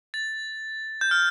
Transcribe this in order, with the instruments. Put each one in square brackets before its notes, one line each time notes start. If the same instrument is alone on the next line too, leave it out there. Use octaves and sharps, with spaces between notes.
[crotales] A6
G6
F6